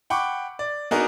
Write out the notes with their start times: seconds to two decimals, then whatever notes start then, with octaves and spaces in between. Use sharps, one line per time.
0.10 F#5 G5 B5 C#6 D6
0.59 D5
0.91 B3 D4 D#4 F#4 G#4 A#4